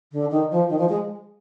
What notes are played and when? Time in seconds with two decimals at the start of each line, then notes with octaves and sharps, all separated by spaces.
0.12 D3
0.31 D#3
0.51 F3
0.69 D#3
0.79 F3
0.89 G#3